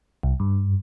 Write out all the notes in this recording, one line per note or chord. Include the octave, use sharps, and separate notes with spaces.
C2
G2